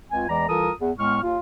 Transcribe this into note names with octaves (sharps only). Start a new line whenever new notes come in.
C#2 C4 F4 G#5
E2 E3 G#3 D5 A#5
C2 E3 F4 A4 A#4 D#6
E2
A2 G#3 B3 C#6 F6
D#2 F4